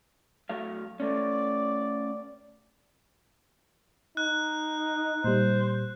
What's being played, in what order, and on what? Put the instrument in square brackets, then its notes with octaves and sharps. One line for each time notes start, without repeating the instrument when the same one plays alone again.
[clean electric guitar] F#3 A3 F5
[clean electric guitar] A3 C#4 [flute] D5
[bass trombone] D#4 [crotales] F#6
[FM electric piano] A#2 G3 [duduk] C5